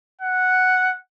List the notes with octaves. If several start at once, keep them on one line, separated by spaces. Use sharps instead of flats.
F#5